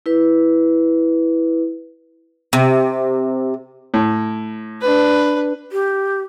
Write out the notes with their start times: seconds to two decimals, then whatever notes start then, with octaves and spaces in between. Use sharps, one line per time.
0.06 E4 B4
2.53 C3
3.94 A2
4.81 D4 B4
5.72 G4